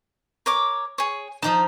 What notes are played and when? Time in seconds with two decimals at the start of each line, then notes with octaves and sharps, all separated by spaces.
0.46 A#4 C#5 D6
0.98 G#4 C#5
1.42 F3 D#4 A5 A#5 D#6